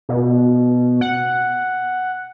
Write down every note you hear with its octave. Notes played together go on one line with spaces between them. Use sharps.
B2
F#5